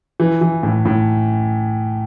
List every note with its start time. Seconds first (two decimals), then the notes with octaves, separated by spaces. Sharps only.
0.20 E3
0.41 E3
0.63 A2
0.85 A2